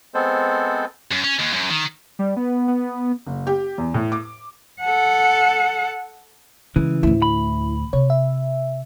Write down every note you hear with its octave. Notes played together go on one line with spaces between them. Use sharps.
G#3 B3 C4 A4 C5
F#2
C#4
D#2
F#2
D#3
G3
B3
B3
F#1
G4
E2
A2
D6
A4 F#5
C#3 E3 G#3
D2 A2 E4
B5
C3 C#5
E5